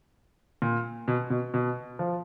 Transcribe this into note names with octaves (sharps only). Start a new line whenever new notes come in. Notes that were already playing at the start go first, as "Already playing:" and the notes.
A#2
B2
B2
B2
F3